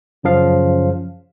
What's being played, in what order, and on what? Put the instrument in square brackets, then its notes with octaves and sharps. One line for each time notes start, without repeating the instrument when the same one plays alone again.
[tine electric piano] F#2 F3 F5 [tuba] C#3